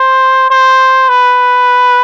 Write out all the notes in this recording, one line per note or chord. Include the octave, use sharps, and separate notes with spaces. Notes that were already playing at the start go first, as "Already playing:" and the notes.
Already playing: C5
C5
B4